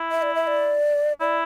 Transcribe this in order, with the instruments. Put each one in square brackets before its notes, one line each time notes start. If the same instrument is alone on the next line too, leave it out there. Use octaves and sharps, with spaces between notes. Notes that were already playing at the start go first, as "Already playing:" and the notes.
Already playing: [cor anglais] E4
[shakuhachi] E5
D5
E5
D5
[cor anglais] E4 [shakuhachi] D5